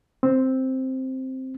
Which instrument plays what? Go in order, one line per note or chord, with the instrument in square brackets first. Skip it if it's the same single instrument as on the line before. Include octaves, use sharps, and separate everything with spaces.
[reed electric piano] C4